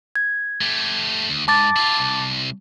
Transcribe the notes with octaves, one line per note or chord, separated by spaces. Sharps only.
G#6
A3 G4
D2
G#2 A5 D6 A6
E4 F4
C2